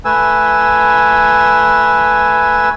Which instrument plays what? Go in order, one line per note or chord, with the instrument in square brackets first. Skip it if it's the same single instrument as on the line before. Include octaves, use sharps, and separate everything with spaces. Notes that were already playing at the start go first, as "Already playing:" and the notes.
[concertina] A3 B4 G#5 E6